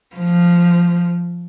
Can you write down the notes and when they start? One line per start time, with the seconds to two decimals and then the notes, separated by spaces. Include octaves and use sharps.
0.15 F3